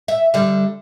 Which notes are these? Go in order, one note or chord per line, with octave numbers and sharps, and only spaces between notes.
E5
D3 G3